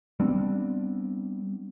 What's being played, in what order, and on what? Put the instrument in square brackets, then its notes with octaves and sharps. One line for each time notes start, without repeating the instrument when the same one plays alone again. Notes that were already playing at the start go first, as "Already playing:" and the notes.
[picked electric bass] G3 B3 C4 D4